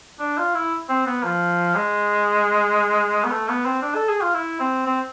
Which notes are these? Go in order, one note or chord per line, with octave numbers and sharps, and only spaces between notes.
D4
F4
E4
C4
B3
F3
G#3
B3
A3
B3
C4
D4
A4
G#4
F4
E4
C4
C4